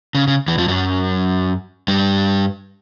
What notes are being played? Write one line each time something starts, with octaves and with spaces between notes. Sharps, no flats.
C#3
C#3
E2 E3
F2 F3
F#2 F#3
G2 G3